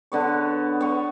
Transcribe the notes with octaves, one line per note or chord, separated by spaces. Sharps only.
D3 B3 C#5
B3 C#6